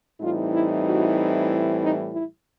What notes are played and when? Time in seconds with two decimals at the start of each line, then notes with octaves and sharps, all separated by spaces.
0.21 A2 E3 G3 C4 D#4 F4
0.54 E4
0.85 F#4
1.82 D#4
2.13 E4